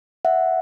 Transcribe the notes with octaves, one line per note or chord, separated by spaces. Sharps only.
E5 F#5